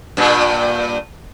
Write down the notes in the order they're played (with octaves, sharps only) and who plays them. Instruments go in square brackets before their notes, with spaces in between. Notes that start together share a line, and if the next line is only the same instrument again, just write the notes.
[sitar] G2 A#2